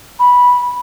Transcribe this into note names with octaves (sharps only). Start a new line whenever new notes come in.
B5